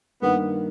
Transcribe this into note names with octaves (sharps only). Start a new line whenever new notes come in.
G2 D#3 A#3 B3